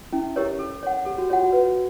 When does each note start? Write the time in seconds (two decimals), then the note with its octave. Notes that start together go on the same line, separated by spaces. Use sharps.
0.13 C#4 E4
0.36 E4 G4 A#4 C#5
0.59 A4
0.83 C#5 F#5
1.05 G4 A4
1.18 F#4
1.30 F4 C#5 F#5
1.43 F#4
1.52 B4